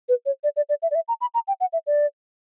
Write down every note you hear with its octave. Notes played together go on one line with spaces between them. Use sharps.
B4
C#5
D5
D5
D5
E5
D5
E5
A#5
B5
A#5
G5
F#5
E5
D5